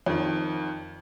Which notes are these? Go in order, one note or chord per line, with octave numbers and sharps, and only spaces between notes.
F2 D#3